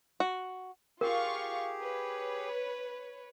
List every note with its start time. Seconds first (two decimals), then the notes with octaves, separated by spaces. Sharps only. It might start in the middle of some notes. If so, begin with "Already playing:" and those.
0.20 F#4
1.01 F4 G4 G#4 A#4 F5 C#6
1.83 B4 C#5